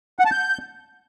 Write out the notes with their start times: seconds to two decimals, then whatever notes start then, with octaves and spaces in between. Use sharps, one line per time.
0.19 F#5
0.25 A5
0.31 G6